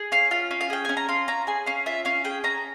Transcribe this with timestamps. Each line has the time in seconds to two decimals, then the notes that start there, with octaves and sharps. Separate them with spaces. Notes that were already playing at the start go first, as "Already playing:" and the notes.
Already playing: G#4
0.12 C#4 F5
0.31 F4 F5
0.51 C#4
0.61 F5
0.70 G#4 G5
0.85 C#4 G#5
0.97 A#5
1.08 F4 C6
1.28 C#4 A#5
1.47 G#4 G#5
1.66 C#4 F5
1.86 F4 E5
2.05 C#4 F5
2.24 G#4 G5
2.44 C#4 A#5